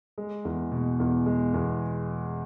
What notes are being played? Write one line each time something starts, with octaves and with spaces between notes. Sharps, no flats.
G#3
E2
B2
E2
G#3
E2